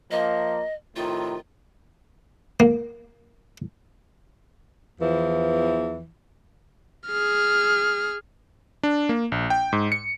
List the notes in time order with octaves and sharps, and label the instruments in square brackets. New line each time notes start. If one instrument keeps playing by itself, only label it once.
[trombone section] F3 A#3 [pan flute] D#5
[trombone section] A2 C3 D#3 [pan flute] F4
[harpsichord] A#3
[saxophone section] E2 E3 F3
[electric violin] G#4 F6
[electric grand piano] D4
A#3
A#1
G5
G#2
C#7